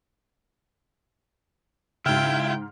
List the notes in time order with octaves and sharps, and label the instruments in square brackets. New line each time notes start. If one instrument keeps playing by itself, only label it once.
[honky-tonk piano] G#2 F6 [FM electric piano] C#3 [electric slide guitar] E4 F4 [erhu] G5